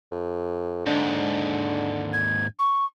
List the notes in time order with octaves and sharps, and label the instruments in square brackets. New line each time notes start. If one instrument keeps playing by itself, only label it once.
[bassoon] F2
[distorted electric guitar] D#2 G#2 [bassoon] D3 [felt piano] D4
[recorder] G#6
C#6